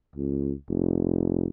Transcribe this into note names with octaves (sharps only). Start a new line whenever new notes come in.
C#2
F1